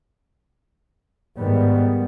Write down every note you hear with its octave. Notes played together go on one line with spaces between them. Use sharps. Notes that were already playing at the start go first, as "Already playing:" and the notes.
G#2 D#3 G3 B3